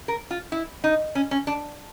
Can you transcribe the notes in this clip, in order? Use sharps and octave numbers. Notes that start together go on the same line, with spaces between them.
A#4
F4
E4
D#4
C#4
C#4
D4